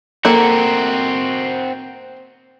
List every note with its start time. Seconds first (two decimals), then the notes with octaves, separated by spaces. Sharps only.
0.25 A#3 C4 F#4 A4 F#5